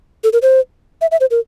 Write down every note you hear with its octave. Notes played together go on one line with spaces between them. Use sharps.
A4
A#4
C5
E5
E5
C5
A#4